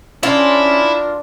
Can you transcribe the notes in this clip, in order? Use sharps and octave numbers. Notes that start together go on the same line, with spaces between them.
C#4 D4 E4 F4 A#4